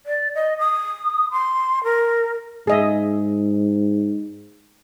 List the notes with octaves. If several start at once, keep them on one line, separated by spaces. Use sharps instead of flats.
D5
D#5
D#6
C6
A#4
G#2 G#4 D#5 E5